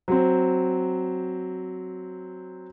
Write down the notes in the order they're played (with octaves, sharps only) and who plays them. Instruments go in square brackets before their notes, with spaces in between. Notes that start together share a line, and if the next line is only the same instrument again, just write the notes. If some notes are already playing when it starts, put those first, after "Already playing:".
[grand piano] F#3 C4